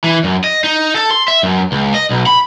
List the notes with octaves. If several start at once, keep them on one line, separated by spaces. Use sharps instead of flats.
E3
F#2
D#5
D#4
A4
C6
E5
F#2
C#2
D#5
B1
B5